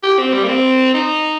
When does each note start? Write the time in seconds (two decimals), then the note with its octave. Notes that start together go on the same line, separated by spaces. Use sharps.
0.03 G4
0.19 C4
0.33 G3
0.44 A#3
0.48 C4
0.94 D#4